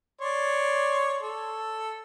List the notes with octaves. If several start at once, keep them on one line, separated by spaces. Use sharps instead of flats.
C#5 D5 C6
A4